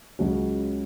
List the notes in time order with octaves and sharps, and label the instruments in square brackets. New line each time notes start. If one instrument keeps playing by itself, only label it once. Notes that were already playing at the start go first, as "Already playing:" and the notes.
[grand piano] C#2 C#3 F#3 C#4 F#4